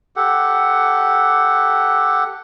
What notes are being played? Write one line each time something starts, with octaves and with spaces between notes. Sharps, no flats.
G4 A4 F#5